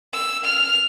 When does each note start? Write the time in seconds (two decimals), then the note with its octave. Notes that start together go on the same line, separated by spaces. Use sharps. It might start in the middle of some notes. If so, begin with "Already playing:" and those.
0.13 E6
0.45 F6